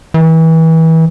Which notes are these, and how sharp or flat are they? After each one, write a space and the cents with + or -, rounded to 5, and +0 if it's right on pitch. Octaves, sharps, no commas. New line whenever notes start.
E3 -30